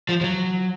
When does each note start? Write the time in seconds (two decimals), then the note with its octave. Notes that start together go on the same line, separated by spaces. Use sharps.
0.09 F3
0.21 F3
0.24 F#3